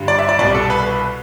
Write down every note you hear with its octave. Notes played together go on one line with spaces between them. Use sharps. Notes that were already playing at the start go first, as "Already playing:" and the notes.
Already playing: G2 D3 G3
D5
E5
D5
C2 B2 G3 D5
A4
B4